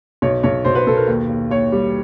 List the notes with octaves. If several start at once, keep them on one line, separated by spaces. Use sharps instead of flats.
B1 C#5
B1 C#5
B1 C5
B4
B1 A4
A#4
D#2
D#2
D#2 C#5
G3